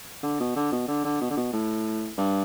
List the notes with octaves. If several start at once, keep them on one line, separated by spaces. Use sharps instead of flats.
D3
B2
D3
B2
D3
D3
B2
D3
B2
A2
G2